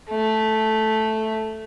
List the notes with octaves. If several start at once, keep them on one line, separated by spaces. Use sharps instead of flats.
A3